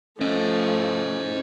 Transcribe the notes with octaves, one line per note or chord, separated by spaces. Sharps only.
F3 A3 C#4 C5 D#5